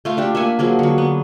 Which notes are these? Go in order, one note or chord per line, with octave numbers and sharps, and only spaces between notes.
A3 F4 F5
A3 D4 G4 A4
A#3 E5 F#5 G#5
F3 F#3 A#3 G#4
D3 F#3
B3